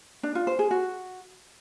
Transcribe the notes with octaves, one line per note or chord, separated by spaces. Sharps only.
D4
F4
C5
G#4
F#4